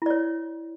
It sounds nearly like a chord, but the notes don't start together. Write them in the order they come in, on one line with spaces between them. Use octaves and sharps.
E4 D5 C#5